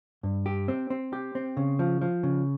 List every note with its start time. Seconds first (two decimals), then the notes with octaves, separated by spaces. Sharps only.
0.23 G2
0.46 G4
0.68 C4
0.90 C4
1.13 G4
1.35 C4
1.57 C#3
1.79 F3
2.01 F3
2.23 C#3